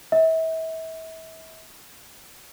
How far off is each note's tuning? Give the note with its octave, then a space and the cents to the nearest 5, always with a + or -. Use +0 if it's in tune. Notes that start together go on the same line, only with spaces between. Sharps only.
E5 -35